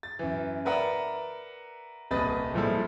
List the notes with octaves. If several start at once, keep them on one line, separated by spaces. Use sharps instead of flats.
A6
F#2 E3
A#4 B4 D5 E5 F#5 A#5
D#1 C2 B4 D#5 B5 A6
A#2 F3 G3 G#3 E4 A4